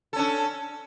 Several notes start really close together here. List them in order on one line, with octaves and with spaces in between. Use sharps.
A4 C#4 D4